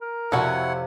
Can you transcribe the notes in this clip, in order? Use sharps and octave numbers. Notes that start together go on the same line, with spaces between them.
A#4
F2 C3 E4 F#4 A4 C#5 F#5